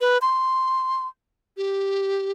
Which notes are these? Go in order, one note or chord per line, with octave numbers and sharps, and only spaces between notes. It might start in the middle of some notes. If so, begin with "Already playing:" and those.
B4
C6
G4